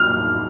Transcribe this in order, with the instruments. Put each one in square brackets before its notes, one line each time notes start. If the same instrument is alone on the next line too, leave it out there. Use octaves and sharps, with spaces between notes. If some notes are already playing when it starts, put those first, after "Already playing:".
Already playing: [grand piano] F6